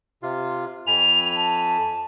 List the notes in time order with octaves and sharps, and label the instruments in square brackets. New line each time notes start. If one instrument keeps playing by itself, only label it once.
[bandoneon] C3 F4
[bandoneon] F2 G#5 B5 [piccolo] F7
[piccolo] A5